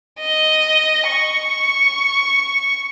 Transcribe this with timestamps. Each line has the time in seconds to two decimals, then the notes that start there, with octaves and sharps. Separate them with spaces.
0.20 D#5
1.09 C#6